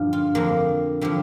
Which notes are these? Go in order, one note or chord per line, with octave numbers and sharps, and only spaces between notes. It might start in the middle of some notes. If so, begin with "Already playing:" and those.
Already playing: G2 A#2 D3 F3
F4
F2 D3 F3 A#3
D3 F3 G3